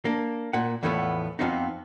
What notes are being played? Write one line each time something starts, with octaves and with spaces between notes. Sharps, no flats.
A#3 D4
A#2 F#5
E2 A2 E3 F3 A3 B3
F2 C#3 F3 B3 C4 D#4